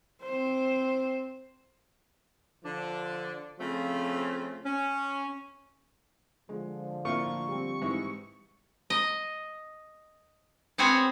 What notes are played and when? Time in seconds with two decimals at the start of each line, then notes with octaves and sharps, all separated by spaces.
0.22 C4 C5
2.64 D3 F3 D4
3.59 C#3 F3 A3 C4 F4
4.64 C#4
6.49 D3 F3 G#3
7.05 A2 A#3 D4 F4 E5 C#6
7.48 G3 C4
7.82 G#2 E3 E4
8.90 D#5
10.78 B3 C4 F#4 G#4 C#5 G#5